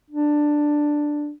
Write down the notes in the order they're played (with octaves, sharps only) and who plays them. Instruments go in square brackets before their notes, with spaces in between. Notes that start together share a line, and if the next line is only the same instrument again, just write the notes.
[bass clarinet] D4